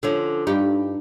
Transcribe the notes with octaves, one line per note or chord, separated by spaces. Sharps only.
D3 F3 C#4
G2 D#4 G4